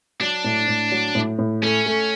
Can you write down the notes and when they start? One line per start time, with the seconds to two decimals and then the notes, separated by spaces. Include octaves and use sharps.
0.21 F#3 D4
0.44 A2
0.68 A2
0.92 F#3
1.15 A2
1.39 A2
1.63 A3 C#4
1.86 A3